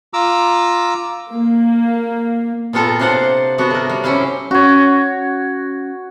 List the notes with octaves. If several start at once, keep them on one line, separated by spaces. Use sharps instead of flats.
F4 A#5 D6 E6
A#3
A#2 B3 F4 A4 A#4 A#5
C3 D4 C5 F5 F#5
C3 B3 D4 F#4
A3 A#4
G3
F#3 C#4 E4 C5 F5
C#4 F#4 C#5